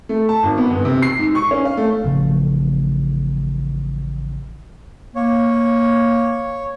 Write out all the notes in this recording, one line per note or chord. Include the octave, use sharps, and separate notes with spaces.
A3
A5
G#1
B3
G1
C3
C7
G#2
C#6
C#4
F5
A3
A1 C#3 F3
A#3 C#5